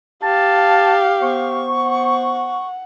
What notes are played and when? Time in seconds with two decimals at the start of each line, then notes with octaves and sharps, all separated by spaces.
0.23 G4 F5 A5
1.22 B3 C5 C#6
1.76 F#5